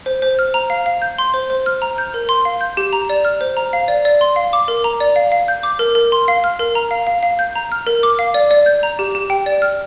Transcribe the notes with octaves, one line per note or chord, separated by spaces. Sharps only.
C5
C5
F6
A#5
F5
F5
G6
C6
C5
C5
F6
A#5
G6
A#4
C6
F5
G6
G4
A#5
D5
F6
C5
A#5
F5
D5
D5
C6
F5
D6
A#4
A#5
D5
F5
F5
G6
D6
A#4
A#4
C6
F5
F6
A#4
A#5
F5
F5
F5
G6
A#5
F6
A#4
D6
F5
D5
D5
G6
A#5
G4
G4
G5
D5
F6